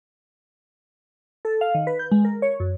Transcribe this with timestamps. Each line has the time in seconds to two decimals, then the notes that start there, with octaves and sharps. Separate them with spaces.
1.45 A4
1.61 F5
1.75 D#3
1.87 B4
1.99 G6
2.11 G#3
2.25 A#4
2.42 C#5
2.60 F#2